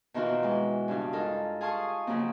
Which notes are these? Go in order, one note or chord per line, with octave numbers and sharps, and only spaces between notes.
B2 D#3 E3 C4 F4 F#4
E3 G#3
G2 C#3 D4 F#4
D#4 F4 A4 A#4
G#4 F5 A5 C6 C#6 D#6
C#3 F3 F#3 A#3 C4